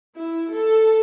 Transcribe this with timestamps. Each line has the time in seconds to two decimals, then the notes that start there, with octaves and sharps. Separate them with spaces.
0.15 E4
0.51 A4